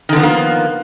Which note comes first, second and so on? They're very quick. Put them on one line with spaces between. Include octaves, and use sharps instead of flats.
D#3 D3 B3 F3 A#3